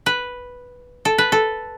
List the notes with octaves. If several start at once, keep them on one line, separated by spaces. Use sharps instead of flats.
B4
A4
B4
A4